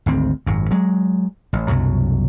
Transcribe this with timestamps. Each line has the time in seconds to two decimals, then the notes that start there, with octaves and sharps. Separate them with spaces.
0.06 G#1 D2 C4
0.46 G#1 F#2
0.71 F#3 G#3
1.53 A1
1.68 C2 F#2 B2 F#3